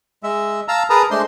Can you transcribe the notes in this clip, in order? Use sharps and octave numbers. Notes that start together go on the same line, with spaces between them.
G#3 E5
F5 A5 A#5 E6
G#4 A#4 B4 A5 A#5 D#6
G#3 A3 D4 C5 C6